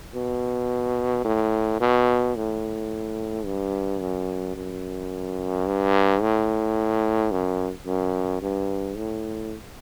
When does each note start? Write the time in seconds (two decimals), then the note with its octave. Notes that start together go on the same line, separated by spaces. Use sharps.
0.15 B2
1.25 A2
1.80 B2
2.36 A2
3.45 G2
4.01 F#2
4.56 F#2
5.66 G2
6.22 A2
7.31 F#2
7.86 F#2
8.42 G2
8.97 A2